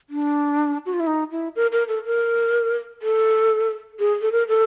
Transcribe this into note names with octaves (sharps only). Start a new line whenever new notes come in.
D4
F#4
F4
E4
D#4
E4
A#4
A#4
A4
A#4
A4
G#4
A4
A#4
A4